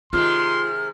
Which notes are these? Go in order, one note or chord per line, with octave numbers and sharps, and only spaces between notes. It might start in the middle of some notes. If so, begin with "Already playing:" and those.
C3 D#3 G#3 F4 C6 F6